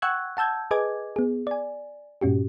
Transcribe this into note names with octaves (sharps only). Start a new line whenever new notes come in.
F#5 G5 C#6 E6 F#6 G#6
F#5 A5 E6 G6 G#6
G#4 B4 D#5 G#5 D6 G#6
B3 G#4
D5 G#5
G2 A#2 C#4 F#4 G4